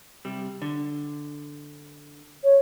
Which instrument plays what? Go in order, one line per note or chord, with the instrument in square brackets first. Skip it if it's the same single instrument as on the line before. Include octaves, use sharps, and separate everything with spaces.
[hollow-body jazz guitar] C3 G3
D3
[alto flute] C#5